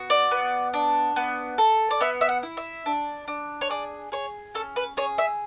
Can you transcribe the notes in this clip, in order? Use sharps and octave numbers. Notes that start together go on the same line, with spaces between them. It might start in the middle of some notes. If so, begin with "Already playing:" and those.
Already playing: B3 F#4
D5
B3
D4
B3
A4
D5
B3 E5
E5
F#5
E4
E5
D4
D4
C#5
G#4 D5
G#4 C#5
C#4 A4
B4
G#4 C#5
E5